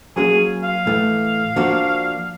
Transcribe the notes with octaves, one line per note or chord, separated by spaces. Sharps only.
F#3 A#3 C#4 G#4
F5
A2 E3 A3
F3 A#3 D4 F#4